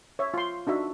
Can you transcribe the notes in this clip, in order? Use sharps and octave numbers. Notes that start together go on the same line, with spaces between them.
C#5 E5
F4 C6
D4 D#4 F#4 E5